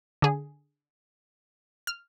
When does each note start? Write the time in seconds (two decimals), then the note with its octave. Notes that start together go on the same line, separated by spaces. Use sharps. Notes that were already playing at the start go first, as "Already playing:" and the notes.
0.22 D3 G#4
1.87 F6